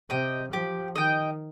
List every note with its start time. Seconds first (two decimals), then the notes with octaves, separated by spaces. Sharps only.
0.10 C3 D#5 G5
0.52 F3 G4
0.96 D#3 D#5 G5